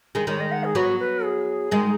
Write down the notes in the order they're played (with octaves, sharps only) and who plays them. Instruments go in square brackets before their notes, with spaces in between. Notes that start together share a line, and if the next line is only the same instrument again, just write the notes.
[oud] D#3 G#3
[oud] D#3 G#3 [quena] C#5
[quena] D#5
F#5
G#4
[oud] F#3 B3 [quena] F#4
[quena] B4
G#4
[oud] D#3 G#3